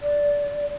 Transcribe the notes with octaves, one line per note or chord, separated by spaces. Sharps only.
D5